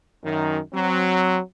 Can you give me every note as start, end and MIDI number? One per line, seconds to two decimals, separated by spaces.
0.22 0.59 42
0.22 0.59 51
0.72 1.38 54
0.72 1.38 60